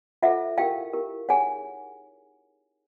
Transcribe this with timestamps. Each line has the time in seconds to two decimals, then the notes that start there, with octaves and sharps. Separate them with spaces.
0.22 F4 A4 C5 E5 F#5
0.58 E4 G4 A#4 F5 G5
0.93 E4 G4 A#4
1.29 D#4 G#4 C#5 F#5 G#5